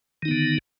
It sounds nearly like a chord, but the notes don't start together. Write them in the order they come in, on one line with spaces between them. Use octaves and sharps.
D#3 D#4 B3 D3